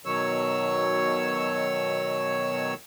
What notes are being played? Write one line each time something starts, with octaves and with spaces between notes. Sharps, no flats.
B2 D#3 F#3 C#5 E6